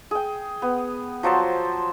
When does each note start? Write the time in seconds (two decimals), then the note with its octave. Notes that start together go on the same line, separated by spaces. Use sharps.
0.11 G#4 G5
0.62 B3
1.23 F3 F#3 C5 A5